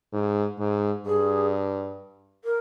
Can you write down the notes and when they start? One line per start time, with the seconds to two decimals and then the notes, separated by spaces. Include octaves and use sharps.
0.12 G#2
0.59 G#2
1.06 G2 G#4
2.44 A#4